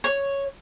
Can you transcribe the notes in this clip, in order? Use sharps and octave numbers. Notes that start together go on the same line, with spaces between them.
C#5